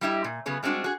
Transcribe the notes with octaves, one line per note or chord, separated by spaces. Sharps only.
G3 D4 E4 G4 D#5
A#2
C#3 F#3 B3 G#4 C#5
G3 G#3 C4 D4 F#4
F#4 G#4